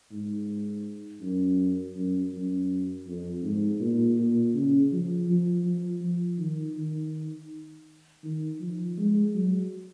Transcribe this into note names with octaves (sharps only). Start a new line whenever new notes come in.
G#2
F#2
F#2
F#2
F2
G#2
A#2
A#2
C#3
F3
F3
F3
F3
D#3
D#3
D#3
F3
G#3
F#3